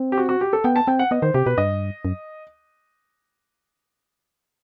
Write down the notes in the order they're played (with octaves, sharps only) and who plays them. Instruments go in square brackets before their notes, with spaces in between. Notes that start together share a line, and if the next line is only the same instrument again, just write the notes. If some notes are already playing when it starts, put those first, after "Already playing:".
Already playing: [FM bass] C4
[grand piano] G4
F#4
F#4
G4
A4
[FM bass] B3 [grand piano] G5
[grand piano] A5
[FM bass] C4 [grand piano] G5
[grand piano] F#5
[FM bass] B3 [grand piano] D#5
[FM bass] D#3 [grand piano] C5
[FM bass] C3 [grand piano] G4
[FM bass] B2 [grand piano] B4
[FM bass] G2 [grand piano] D#5
[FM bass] F#2